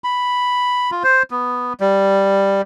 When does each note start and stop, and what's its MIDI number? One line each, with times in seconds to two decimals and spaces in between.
0.04 0.91 83
0.91 1.03 65
1.04 1.23 72
1.31 1.73 59
1.80 2.62 55